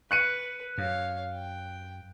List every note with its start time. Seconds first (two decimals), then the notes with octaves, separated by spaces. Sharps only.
0.11 B4 F#6 C#7 D#7
0.78 F#2 C#5 F5
1.33 G5